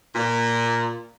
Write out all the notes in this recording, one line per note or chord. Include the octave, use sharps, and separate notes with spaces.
A#2